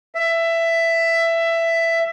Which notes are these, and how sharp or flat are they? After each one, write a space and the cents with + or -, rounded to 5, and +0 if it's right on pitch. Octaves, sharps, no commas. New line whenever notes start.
E5 +15